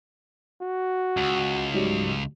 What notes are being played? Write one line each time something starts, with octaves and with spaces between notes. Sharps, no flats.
F#4
C#2
G#2 F#3 G3